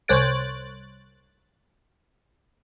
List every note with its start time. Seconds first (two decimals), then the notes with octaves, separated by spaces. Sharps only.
0.08 C2 C5 C#5 F#6 A6 D7